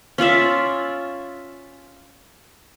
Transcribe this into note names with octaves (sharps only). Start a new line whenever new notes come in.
C#4 F4 D5 E5